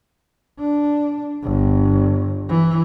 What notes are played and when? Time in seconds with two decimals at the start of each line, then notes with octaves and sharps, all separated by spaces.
0.59 D4
1.44 G1
2.49 E3